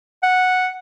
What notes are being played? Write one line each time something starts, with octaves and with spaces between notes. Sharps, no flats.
F#5